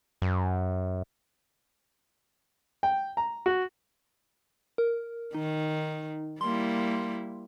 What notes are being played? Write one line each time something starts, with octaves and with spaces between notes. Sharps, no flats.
F#2
G5
A#5
F#4
A#4
D#3 D#4
G3 A#3 E4 C6